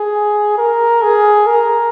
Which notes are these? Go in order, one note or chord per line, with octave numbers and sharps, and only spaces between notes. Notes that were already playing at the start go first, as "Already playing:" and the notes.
Already playing: G#4
A#4
G#4
A#4